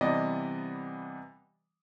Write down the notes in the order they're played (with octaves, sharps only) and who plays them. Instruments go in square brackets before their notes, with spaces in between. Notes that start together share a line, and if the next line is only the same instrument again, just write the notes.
[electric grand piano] C3 E3 G3 B3 D5 D#5